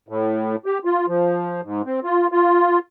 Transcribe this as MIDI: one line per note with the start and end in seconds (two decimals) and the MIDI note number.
0.09 0.56 45
0.66 0.78 67
0.85 1.06 65
1.08 1.61 53
1.63 1.82 44
1.86 2.00 60
2.04 2.27 65
2.32 2.79 65